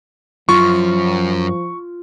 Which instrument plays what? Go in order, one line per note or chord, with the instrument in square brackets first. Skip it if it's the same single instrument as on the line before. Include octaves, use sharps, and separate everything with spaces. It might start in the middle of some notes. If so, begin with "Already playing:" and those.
[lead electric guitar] F#2 [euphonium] F3 [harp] F4 [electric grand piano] C#6